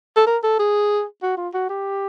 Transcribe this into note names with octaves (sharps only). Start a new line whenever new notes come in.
A4
A#4
A4
G#4
F#4
F4
F#4
G4